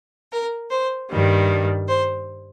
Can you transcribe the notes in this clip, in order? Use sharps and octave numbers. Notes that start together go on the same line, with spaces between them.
A#4
C5
G2 D#3 G3
C5